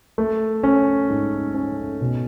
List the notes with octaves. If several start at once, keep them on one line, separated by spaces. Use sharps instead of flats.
A3
C#4
G#2
C#4
B2